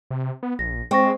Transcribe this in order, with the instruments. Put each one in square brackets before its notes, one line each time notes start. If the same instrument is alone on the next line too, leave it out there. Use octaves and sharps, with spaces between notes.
[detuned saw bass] C3
B3
[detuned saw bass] A#1 [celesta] A#6
[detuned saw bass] G#3 [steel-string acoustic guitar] C4 [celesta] G5 C#6 A#6